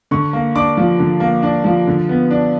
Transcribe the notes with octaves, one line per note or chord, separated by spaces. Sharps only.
D3 C#6
A#3
D4 D6
F3
D3
A#3
D4
F3
D3
B3
D4